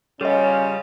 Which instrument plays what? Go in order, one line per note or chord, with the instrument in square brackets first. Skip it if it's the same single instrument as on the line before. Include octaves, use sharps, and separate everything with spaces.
[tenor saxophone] C#3 [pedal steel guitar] G3 F4 [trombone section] C#4 [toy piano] G#4 D#5